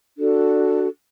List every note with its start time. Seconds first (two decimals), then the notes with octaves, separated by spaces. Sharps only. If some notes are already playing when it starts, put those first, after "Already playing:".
0.19 D4 F#4 A4